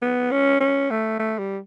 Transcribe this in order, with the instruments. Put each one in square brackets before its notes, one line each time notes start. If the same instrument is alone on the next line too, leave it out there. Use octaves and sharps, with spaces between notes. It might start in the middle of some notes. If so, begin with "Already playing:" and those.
[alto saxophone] B3
C#4
C#4
A3
A3
G3